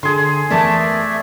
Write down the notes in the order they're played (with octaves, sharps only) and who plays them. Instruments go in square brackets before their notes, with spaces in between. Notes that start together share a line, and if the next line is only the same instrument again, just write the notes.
[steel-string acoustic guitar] D3 [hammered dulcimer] G#4 C6
[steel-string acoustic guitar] E2 A#4 A5 [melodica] A3 D5 E5